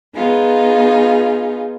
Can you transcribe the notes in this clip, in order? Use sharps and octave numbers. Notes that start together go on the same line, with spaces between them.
B3 D#4 F4 G#4